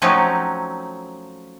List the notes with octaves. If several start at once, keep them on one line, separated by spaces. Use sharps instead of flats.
F3 F#3 A3 C4 C#4 D#4